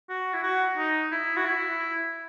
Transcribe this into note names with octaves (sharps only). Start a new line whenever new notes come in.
F#4
E4
F#4
D#4
E4
F#4
E4